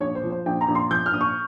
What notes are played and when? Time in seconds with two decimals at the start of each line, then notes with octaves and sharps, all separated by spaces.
0.01 A#1 C#5
0.15 C5
0.24 F3
0.30 C5
0.46 A#1 G5
0.61 A#5
0.69 A#1
0.75 C6
0.91 F3 G6
1.06 F6
1.13 A#1 D#6
1.21 C#6